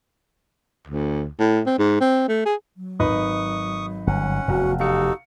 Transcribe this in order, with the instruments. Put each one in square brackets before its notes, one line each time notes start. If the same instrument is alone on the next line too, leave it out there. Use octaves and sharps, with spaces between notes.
[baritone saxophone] D2
A2
C4
G#2
C4
A3
G#4
[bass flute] F#3
[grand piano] G#1 D#4 B4 [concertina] C#6 D#6
[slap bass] G1 [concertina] C#4 F#5
[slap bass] F1 E2 [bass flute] F#4
[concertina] D#4 F#4 A4 [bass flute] G4 [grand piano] F5 C#7